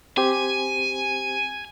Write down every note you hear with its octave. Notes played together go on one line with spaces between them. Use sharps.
C4 G4 C5 G#5